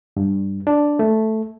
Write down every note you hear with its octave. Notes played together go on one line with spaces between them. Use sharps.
G2
D4
A3